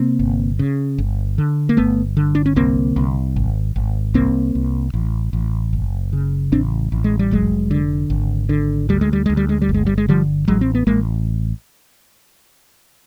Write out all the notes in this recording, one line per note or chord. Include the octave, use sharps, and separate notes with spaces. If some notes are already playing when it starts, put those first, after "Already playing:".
Already playing: C3 A#3 C4
G1
C#3
G1
D3
A#3
G1 A3 B3
D3
D4
C#4
C2 A#3 C4
C2
G#1
G#1
C2 A#3 C4
C2
A1
A1
F#1
C#3
A1 C4 D4
A1
G#3
G3
F1 F#3 G#3
D3
G#1
D3
D2 G3
G#3
G3
D2 G#3
G3
G#3
G3
G1
G#3
G3
G#3
D3 F3 G3
A1 F#3 G#3
C4
B3
A1 G#3 A#3